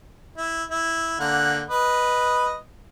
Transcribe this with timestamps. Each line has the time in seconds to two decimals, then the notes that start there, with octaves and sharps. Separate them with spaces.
0.37 E4
0.70 E4
1.20 D3 A#3 F#5
1.70 B4 D#5